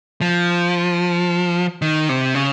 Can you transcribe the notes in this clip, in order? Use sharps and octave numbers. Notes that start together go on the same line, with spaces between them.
F3
D#3
C3
C#3